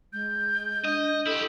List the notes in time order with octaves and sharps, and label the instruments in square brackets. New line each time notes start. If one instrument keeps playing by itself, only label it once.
[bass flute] G#3 [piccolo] G6
[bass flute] D4 [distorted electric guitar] D#5
[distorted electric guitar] E4 G4 [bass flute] A4